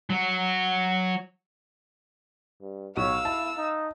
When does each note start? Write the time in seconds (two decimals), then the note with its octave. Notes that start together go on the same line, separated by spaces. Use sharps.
0.10 F#3 F#4
2.61 G2
2.97 B1 C#5 F5 E6
3.25 E4 A5
3.57 D#4